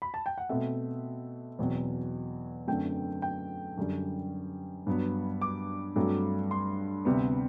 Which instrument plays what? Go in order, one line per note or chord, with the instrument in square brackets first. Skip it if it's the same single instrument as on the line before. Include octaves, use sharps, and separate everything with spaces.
[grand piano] B5
A5
G5
F#5
B2 A3 C4 E5
E2 B2 F#3 C4
F#2 D3 A3 C4 G5
G5
F#2 D3 G3
G2 F#3 B3
D6
G2 F#3 A3 C4
C6
D2 C3 G3 B3